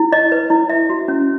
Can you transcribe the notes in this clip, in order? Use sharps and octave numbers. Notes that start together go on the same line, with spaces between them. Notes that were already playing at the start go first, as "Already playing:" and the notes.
Already playing: E4
D#5
B4
E4
E5
F#4
C#4